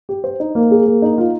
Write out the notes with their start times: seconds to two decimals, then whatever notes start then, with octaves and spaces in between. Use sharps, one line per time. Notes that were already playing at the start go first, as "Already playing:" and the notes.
0.09 G4
0.24 C5
0.40 D#4
0.55 A#3
0.71 G#4
0.86 A#3
1.02 D#4
1.18 F4